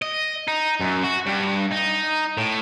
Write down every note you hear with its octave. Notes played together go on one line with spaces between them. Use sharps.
D#5
D#4
F#2
F#4
G2
D#4
A2